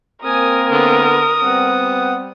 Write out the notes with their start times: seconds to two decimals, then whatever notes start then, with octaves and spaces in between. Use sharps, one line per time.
0.24 A#3 C4 A#4 G#5 D#6
0.72 D3 B3 D#6
1.43 G3 B3 C4 F#5